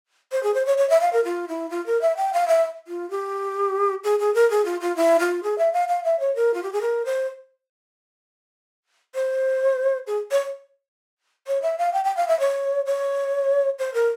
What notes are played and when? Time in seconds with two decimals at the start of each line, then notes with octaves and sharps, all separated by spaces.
0.32 C5
0.43 G#4
0.54 C5
0.67 C#5
0.78 C#5
0.90 E5
1.01 F5
1.13 A#4
1.25 F4
1.48 E4
1.70 F4
1.86 A#4
2.02 E5
2.17 G5
2.33 F5
2.48 E5
2.88 F4
3.10 G4
4.04 G#4
4.19 G#4
4.34 A#4
4.50 G#4
4.65 F4
4.81 F4
4.96 E4
5.20 F4
5.43 G#4
5.58 E5
5.73 F5
5.89 F5
6.04 E5
6.20 C#5
6.36 A#4
6.54 F4
6.63 G4
6.73 G#4
6.81 A#4
7.05 C5
9.15 C5
10.07 G#4
10.31 C#5
11.47 C#5
11.62 E5
11.78 F5
11.93 G5
12.04 G5
12.17 F5
12.28 E5
12.40 C#5
12.86 C#5
13.79 C5
13.94 A#4